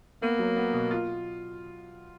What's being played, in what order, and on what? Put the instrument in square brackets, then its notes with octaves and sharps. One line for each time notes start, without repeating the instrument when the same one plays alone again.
[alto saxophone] A#3 [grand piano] B3
[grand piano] F#3
B3
B2
F4